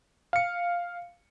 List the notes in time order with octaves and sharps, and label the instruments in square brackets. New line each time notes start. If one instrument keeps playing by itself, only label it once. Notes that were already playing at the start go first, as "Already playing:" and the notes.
[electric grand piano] F5 C#7